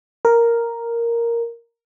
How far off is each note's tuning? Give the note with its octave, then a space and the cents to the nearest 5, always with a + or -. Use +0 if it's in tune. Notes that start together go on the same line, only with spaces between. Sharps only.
A#4 +0